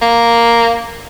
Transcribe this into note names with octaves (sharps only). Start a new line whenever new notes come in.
A#3